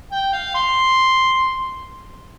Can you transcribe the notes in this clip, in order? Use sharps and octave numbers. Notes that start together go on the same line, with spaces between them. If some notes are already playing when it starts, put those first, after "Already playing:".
G5
F5
C6